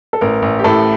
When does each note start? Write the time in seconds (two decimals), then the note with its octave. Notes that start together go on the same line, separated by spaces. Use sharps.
0.13 A4
0.21 A1 A#4
0.42 A1
0.59 G4
0.64 A2 A4